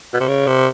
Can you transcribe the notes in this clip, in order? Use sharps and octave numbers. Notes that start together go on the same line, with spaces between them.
B2
C3
C#3
C3